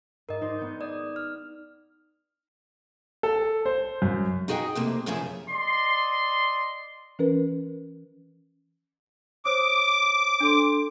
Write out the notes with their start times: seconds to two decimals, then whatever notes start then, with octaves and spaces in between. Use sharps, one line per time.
0.29 G#2 A#4 D#5
0.41 D#4 C5 D5
0.59 B3 G6
0.81 D5 D#6
1.16 F6
3.23 A4
3.65 C5
4.02 F#2
4.48 D#4 F#4 G#4 D#5 G5
4.75 F2 C3 A3 A#3
5.06 F#2 C#3 F3 C#4 G#4 E5
5.49 D5 D#5 C6
7.19 E3 C#4 A#4 B4
9.45 C5 C#5 D6 D#6
10.40 D4 A4 C6